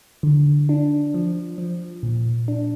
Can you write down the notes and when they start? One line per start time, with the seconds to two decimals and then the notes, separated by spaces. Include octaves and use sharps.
0.23 D3
0.69 D4
1.14 F3
1.58 F3
2.03 A#2
2.48 D4